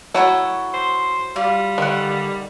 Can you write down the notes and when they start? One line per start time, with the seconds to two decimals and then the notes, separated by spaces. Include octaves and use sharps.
0.14 F#3 E4 F#4 A4 C#5
0.74 C5
1.36 G3 F4
1.78 D3 D#3 F#5